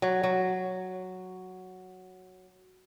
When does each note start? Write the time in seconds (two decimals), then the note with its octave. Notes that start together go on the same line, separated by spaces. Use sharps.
0.02 F#3
0.23 F#3